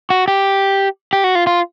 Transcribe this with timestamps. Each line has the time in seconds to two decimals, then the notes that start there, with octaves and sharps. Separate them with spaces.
0.10 F#4
0.28 G4
1.13 G4
1.24 F#4
1.35 F4
1.47 F4